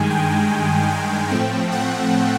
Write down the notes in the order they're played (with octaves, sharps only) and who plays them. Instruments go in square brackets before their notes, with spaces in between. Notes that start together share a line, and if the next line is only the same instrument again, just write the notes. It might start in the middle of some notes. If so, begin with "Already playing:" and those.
Already playing: [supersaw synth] G2 D#3 G#3 G#5
G5
G#5
A2 F3 A3 C4 G5
F#5